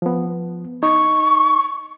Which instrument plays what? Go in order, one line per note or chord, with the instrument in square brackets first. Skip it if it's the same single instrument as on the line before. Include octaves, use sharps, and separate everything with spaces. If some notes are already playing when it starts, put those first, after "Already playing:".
[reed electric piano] F3 B3
[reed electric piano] D#4 [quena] C#6